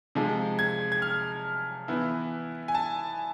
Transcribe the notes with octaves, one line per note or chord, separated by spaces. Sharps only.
C3 F3 G#3
G#6
G#6
F6
E3 B3 E4
G#5
A5